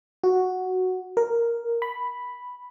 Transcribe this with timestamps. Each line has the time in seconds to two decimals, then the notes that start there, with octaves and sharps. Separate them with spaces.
0.24 F#4
1.17 A#4
1.82 B5